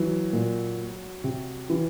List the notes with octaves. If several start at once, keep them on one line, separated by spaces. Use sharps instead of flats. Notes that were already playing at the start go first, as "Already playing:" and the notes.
Already playing: E3 F#3
A#2
C3
E3